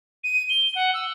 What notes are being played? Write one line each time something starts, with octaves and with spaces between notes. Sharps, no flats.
D#7
G7
F#5
E6